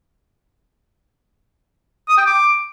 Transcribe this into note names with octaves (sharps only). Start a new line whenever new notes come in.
D#6
G5
D6